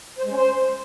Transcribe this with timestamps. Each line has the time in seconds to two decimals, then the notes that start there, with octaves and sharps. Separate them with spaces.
0.19 C5
0.24 G#3
0.30 C#4
0.36 C5